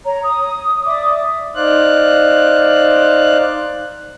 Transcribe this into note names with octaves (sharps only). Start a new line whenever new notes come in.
C#5 A#5
D#6
D5 E5 D6 D#6
D#4 C5 D5 F5 F#6